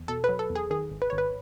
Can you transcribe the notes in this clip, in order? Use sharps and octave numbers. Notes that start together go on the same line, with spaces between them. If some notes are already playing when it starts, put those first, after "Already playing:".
Already playing: E2
B2 A4
B4
F#3
A4
E2
G#4
D#3 G#4
G#1
B4
G#1 C#5
B4